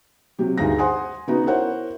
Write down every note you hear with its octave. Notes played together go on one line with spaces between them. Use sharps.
C3 F#3 G4
D2 G2 D#4 G#4 F5 A#6
C5 F#5 G#5 C6 D#6
C#3 B3 D#4 F#4 A#5
E4 A#4 C5 C#5 F#5